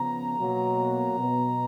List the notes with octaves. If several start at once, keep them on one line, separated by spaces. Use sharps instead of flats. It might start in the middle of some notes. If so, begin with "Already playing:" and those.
Already playing: C#3 F3 B3 A#5
B2 F#3 A#3
B2 F#3 B3